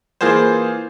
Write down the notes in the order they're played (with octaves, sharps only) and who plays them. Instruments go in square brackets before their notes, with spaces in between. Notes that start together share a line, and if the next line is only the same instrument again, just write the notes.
[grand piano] E3 A#3 F4 G#4 C5